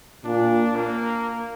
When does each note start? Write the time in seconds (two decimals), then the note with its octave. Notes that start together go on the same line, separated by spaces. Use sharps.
0.25 A#2 D4
0.76 A#3